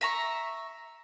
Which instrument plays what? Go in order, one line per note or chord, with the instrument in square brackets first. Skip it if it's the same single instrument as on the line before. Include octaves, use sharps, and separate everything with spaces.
[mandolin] E5 A#5 C#6